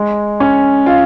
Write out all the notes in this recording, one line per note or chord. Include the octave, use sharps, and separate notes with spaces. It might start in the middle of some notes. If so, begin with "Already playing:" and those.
Already playing: G#3
C#4
F4